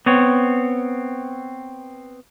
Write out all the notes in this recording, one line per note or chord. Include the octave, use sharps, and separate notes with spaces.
B3 C4 C#5